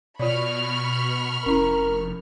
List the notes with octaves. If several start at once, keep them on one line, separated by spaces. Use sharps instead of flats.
B2 F4 C#5 D5 B5 C#6 F6
F1 C#4 E4 A#4